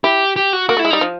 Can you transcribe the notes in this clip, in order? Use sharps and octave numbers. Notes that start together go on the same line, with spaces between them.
E4 G4
G4
F#4
A#3 F#4
A3
E4
G#3
G3 D#4
F3